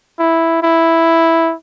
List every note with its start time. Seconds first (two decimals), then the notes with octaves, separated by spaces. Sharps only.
0.19 E4
0.63 E4